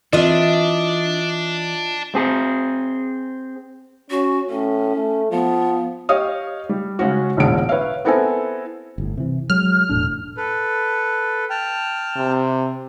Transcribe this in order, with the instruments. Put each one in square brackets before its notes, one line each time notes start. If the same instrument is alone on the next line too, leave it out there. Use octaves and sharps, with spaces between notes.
[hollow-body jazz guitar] E3 C4 [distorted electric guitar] D4 [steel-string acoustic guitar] F4 E5 [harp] D#5
[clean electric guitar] C4 G#4
[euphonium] C#4 [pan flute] F#4
[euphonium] A2 [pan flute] C#4
[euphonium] A3
[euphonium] F3 [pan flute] B3
[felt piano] G4 C#5 D#5 F5 D#6
G3
C#3 G#3 C#4 F#4
E1 A#1 A2 D3 G#4 D7
B4 C#5 E5 F5
B3 C4 E4 A4 A#4 G#5
[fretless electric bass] G1 A2
C3 E3
[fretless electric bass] F#3 G#3 [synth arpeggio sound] F6
[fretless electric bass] E1 A2 D4
[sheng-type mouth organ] A4 B4
G5 A5 F6
[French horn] C3